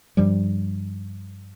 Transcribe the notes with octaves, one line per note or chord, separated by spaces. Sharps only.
G2 F3 G3